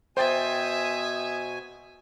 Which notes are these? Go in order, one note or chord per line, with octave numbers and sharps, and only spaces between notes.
B2 C5 E5 G5 G#5 D#6 A6